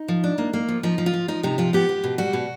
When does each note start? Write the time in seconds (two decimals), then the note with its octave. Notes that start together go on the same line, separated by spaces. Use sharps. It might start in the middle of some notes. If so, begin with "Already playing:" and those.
Already playing: D#4
0.08 F3
0.24 D4
0.38 A#3
0.53 A#3
0.69 F3
0.83 F3 D#4
0.98 F3
1.06 F4
1.14 F3
1.28 F3 D#4
1.43 C3 D#4
1.58 F3 F4
1.73 B3 G4
1.89 B3
2.04 B2
2.18 G3 F#4
2.33 B2